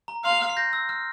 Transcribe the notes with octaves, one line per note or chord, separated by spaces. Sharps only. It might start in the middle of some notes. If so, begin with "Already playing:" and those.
A#5
F5 C6
F6
C7
G6 A#6
E6
F6